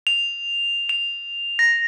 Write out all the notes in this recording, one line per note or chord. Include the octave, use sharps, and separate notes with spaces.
F7
F7
A#6